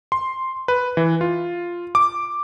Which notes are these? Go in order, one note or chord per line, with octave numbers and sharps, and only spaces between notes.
C6
B4
E3
F4
D6